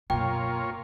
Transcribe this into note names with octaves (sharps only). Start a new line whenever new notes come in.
F#2 B2 A#3 F4 C#5 G5